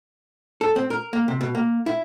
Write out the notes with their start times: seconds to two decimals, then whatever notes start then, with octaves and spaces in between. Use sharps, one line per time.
0.61 A4
0.76 C4
0.90 A#4
1.13 A#3
1.28 C3
1.41 B2
1.55 A#3
1.86 E4